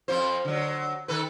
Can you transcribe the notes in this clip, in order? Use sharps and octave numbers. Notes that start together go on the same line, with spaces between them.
F2 F3 C5
D3 F#3
D#3 A4 B4